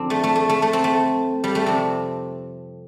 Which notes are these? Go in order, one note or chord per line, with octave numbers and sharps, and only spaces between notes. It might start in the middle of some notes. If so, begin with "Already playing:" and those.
Already playing: F2 D3 C4 D4
A3
A3
A3
A3
A3
C4
A3
G3
A3
F2 C3 C4